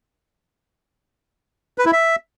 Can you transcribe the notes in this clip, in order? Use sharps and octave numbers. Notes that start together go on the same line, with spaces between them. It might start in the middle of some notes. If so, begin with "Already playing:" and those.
B4
E4
E5